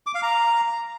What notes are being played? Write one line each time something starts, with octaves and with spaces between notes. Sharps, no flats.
D6
F5
A#5